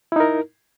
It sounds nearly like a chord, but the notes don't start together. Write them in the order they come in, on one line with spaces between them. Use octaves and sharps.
E4 D#4 A#4